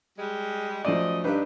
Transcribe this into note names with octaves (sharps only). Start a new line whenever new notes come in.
G3 G#3
F#2 F3 A3 D5 D#5
G2 D4 D#4 B4